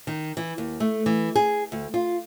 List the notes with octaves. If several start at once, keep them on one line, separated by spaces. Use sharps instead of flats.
D#3
E3
D#2
A3
E3
G#4
D2
F4